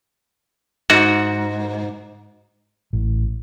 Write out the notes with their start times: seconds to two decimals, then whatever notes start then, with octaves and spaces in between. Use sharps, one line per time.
0.90 G#2 F#4
2.93 A1